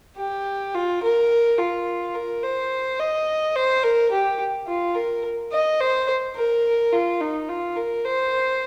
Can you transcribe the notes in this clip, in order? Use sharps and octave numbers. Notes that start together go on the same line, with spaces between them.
G4
F4
A#4
F4
A#4
C5
D#5
C5
A#4
G4
F4
A#4
D#5
C5
A#4
F4
D#4
F4
A#4
C5